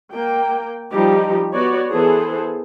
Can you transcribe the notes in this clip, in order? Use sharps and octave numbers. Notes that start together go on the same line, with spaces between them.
A#3 G5
F3 G3 D#4 G4
B3 F#4 C#5 D5
E3 B3 G#4 A4 C5